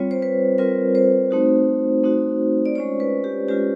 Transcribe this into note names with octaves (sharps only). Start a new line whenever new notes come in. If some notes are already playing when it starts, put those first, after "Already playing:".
Already playing: G3 C4 F4 C#5
C5
B4
G3 C4 F4 A#4
C5
A3 C4 D#4 F#4
A3 C4 D#4 F#4
D5
G#3 C#4 F4 C#5
B4
G4
G#3 C#4 F4 G4